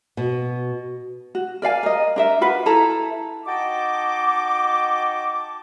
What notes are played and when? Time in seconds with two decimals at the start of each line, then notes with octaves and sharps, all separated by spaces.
0.17 B2
1.35 F#4
1.62 A#4 D5 F5 G#5
1.83 A#4 D#5
2.16 D4 A#4 E5
2.41 F4 F#4 B4 B5
2.66 E4 A4 A#5
3.46 D#4 F#4 D#5 G5 A5 D6